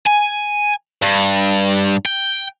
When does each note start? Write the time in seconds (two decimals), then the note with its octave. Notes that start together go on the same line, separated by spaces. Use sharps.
0.07 G#5
1.02 G2
2.06 G5